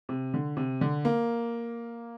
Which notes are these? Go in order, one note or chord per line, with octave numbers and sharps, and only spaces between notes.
C3
D3
C3
D3
A#3